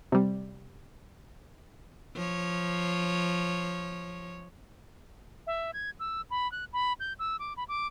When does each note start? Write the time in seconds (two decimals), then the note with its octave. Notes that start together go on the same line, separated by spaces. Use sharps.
0.12 C3 G3
2.16 F3 C#5
5.47 E5
5.74 G#6
6.00 E6
6.30 B5
6.52 F#6
6.73 B5
7.00 G6
7.19 E6
7.39 D6
7.57 B5
7.68 D6